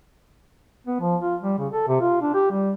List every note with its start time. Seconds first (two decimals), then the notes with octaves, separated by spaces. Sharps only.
0.87 B3
1.00 F3
1.21 F4
1.42 G3
1.58 C#3
1.72 A4
1.88 C3
2.01 F4
2.21 D4
2.34 G4
2.51 G3